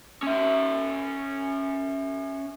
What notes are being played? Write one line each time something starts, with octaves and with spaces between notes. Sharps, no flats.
C#4 E5